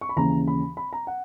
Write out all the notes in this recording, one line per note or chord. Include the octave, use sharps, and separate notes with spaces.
C#6
B5
D#2 C#3 E3 A#5
B5
B5
A#5
F#5